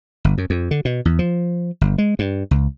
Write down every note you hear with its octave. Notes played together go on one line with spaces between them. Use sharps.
G1
F#2
F2
D3
B2
E2
F3
G1
G#3
G2
C#2